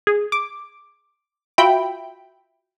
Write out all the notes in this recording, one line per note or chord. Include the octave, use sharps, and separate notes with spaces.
G#4
D6
F4 F#4 E5 G5 B5